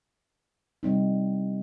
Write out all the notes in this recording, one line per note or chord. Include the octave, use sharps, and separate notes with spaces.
C3 G3 C4 D#4